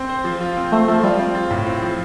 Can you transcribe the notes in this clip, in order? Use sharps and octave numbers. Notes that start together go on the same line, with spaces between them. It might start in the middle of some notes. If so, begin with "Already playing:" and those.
Already playing: C4
C5
F3
F4
C4
A3 C5
F3 A3
G3 F4
C4
F4
A2
C4
F3